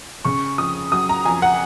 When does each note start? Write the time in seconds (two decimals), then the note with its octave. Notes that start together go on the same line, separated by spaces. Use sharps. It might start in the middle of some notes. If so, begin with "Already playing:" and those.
0.25 C#3 C#6
0.58 F2 D#6
0.92 F#3 D#6
1.09 A#5
1.25 F2 G#5
1.42 F#5